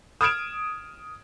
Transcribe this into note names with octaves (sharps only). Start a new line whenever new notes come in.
D#6 F6 G#6 D7 E7